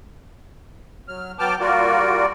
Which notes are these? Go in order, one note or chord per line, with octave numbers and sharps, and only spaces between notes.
F#3 F6
F#3 B3 G5 A5 D6 F6
G3 A#3 F4 F#4 A#4 D5